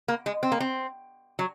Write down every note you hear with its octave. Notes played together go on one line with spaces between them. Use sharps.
A#3
G#3
C4
A#3
C4
F#3